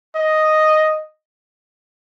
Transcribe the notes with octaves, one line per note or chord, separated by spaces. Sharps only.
D#5